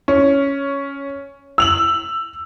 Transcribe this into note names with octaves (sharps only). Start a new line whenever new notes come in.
C#4
E6 F7 F#7